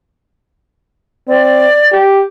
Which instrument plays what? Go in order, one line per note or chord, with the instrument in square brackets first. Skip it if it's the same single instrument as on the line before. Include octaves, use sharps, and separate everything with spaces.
[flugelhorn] C4 [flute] D5
[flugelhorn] G4